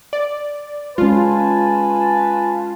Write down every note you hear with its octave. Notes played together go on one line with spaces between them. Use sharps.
D5
G#3 C#4 F4 B4 G#5 A5